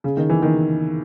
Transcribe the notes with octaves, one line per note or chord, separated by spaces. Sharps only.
C#3
D#3
E3
D#3